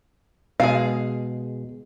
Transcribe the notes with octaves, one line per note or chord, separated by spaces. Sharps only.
B2 G#3 G#4 F5